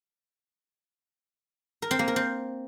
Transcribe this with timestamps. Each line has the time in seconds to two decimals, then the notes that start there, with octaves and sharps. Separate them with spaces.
1.82 A#4
1.91 C4
1.99 A#3
2.08 A#4
2.16 C4